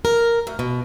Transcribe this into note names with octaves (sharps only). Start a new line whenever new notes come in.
A#4
D2
B2